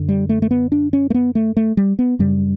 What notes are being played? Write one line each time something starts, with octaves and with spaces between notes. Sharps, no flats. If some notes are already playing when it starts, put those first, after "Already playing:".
Already playing: F#2 D3
G3
A3
A3
B3
D4
C#4
A3
B3
A3
A3
G3
B3
F#2 C#3 G3